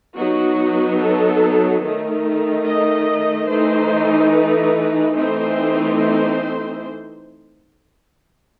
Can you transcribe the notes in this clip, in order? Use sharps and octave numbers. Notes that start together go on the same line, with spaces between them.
F#3 B3 D#4 F#4
A4
D#3 A3 D#4
D#5
E3 A3 D#4 C5
B4
E3 A3 C4 D#4 C5
C5